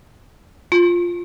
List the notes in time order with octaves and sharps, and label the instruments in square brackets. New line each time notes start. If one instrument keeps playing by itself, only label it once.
[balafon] F4